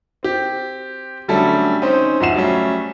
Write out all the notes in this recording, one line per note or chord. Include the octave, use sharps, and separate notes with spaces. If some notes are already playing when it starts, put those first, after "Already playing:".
C4 G4
D3 F#3 G3 A3 C#4 A4
C4 C#4 D#4 C5
G#2 F3 E5 F#5 C7 E7
F#3 G3 A3 C#4